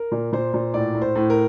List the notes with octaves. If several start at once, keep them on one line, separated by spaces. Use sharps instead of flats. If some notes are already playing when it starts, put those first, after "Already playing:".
Already playing: A#4
A#2
A#2 C5
A#2
A2 D5
A2
C5
A2
A#4